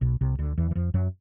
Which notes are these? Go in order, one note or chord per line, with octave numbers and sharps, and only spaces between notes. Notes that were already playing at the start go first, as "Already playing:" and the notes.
B1 B2
C2 C3
D2 D3
E2 E3
E3
F2 F3
F#2 F#3